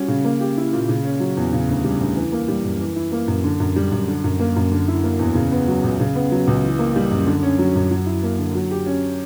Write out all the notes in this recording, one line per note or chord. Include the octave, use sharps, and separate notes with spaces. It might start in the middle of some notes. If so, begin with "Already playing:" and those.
Already playing: G3 C#4 F#4
C#3
A#3
G4
E4
A#2
C#3
C#4
F#3
E2
C#3
D2
G3
D2
E3
A#3
G3
F#2
E3
E4
A#3
F#2
D3
F#2
G3
F#2
D3
F#2
A#3
F#2
D3
E4
A#3
E2
C#3
B3
F#3
C#2
C#3
B3
F#3
C#2
E3
A#3
G3
F#2
D3
C#4
F#3
F#2
F#3
E4
A#3
D3
F#3
G4
C#4